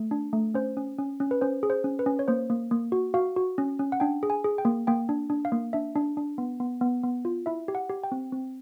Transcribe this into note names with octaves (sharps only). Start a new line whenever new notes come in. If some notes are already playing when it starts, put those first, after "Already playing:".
Already playing: A3
D4
A3
C#4 C5
C#4
C#4
C#4
B4
C#4 C5
G#4
C5
C#4
B4
C#4
C#5
A#3 C5
A#3
A#3
F#4
F#4 F5
F#4
C#4
C#4
F#5
D4 G5
G#4
G#5
G#4
G5
A#3
A#3 G5
D4
D4
F5
A#3
D4 E5
D4
D4
B3
B3
B3
B3
F4
E4 E5
G4
F#5
G4
G5
C4
C4